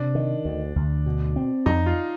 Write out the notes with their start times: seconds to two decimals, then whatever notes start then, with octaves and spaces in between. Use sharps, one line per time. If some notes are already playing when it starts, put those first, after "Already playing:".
Already playing: C3 D4
0.15 D#3
0.45 D2
0.76 D2
1.06 B2
1.36 C4
1.66 F2 D#4
1.86 F4